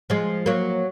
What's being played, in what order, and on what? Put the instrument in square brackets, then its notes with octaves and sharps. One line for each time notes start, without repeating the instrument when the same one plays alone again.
[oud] F3 G#3
F#3 A#3